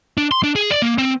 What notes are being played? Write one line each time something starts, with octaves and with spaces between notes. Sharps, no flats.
D4
C6
D4
G#4
D5
A#3
C4